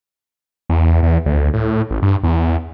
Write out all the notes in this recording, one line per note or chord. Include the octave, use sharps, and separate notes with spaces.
E2
E2
D2
A2
A1
G2
E2